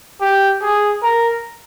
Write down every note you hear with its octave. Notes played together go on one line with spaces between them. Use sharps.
G4
G#4
A#4